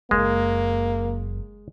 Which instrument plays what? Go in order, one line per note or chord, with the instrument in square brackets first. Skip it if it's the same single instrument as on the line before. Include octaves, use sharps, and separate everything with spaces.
[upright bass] F#1 F#2 [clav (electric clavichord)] G#3 [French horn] A#3